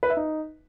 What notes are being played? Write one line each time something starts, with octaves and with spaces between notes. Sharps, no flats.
B4
E5
D#4